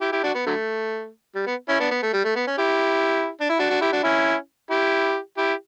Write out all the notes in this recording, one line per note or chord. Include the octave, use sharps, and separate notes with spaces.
E4 G4
E4 G4
D4 F#4
B3
D3 F#3 A3
G3
B3
C#4 E4
B3 D4
B3
A3
G3
A3
B3
C#4
E4 G4
D4
E4
D4 F#4
D4 F#4
E4 G4
D4 F#4
C#4 E4
E4 G4
E4 G4